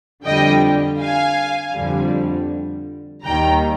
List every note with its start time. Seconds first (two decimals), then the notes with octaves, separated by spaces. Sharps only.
0.25 F2 D3 G3 D#5 G5
1.00 F5 G#5
1.74 F2 D3 G3
3.23 D#2 D#3 G3 G5 A#5